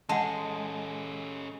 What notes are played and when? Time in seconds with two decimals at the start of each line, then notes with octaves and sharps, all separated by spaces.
0.09 G#3 C#4 A4 F#5 A5